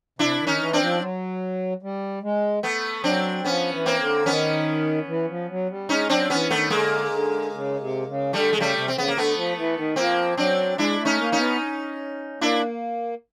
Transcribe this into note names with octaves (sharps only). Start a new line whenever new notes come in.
C3 D4 E4
D#3
C#4 D#4
E3
C4 D4
F3
F#3
G3
G#3
A3 B3
F#3 C4 D4
F3 B3 C#4
E3
A#3 C4
D3
D#3 B3 C#4
E3
F3
F#3
G3
G#3 C#4 D#4
F#3 C4 D4
E3 B3 C#4
D#3 A3 B3
D3 G#3 A#3
D3
C#3
C3
C#3
D3 G3 A3
C#3 G#3
G3 A3
C3
C4
C#3 B3
A#3
D3 A3 B3
F3
E3
D#3
F3 A#3 C4
F#3 C4 D4
G#3 D4 E4
A3
C#4 D#4
A#3
C#4 D#4
B3
A#3 D4 E4